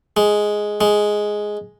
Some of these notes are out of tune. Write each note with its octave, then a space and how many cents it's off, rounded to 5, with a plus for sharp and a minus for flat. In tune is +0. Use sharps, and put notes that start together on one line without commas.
G#3 +5
G#3 +5